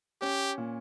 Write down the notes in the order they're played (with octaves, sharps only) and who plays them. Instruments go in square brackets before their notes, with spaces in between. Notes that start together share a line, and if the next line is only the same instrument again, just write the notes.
[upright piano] C#4 [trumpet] G4
[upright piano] A#2